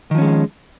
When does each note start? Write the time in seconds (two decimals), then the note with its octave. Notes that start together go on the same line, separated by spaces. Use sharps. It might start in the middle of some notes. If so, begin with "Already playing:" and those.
0.11 D#3
0.15 F3
0.18 C#4
0.21 G#3